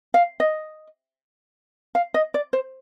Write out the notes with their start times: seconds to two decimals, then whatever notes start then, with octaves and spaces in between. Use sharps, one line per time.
0.14 F5
0.40 D#5
1.95 F5
2.14 D#5
2.34 D5
2.53 C5